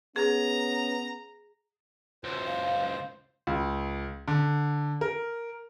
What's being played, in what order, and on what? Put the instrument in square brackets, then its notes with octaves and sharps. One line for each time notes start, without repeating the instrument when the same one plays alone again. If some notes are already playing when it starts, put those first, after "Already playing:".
[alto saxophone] B3 [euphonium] C#4 [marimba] G#4 [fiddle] A#5
[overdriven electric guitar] C#2 F#2 [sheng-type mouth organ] C5
[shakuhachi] F5
[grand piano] C#2
D3
A#4